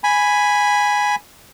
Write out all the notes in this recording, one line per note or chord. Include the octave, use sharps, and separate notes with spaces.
G#5 B5